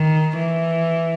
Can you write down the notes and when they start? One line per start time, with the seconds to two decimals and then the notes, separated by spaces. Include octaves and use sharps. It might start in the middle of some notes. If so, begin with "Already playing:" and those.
Already playing: D#3
0.38 E3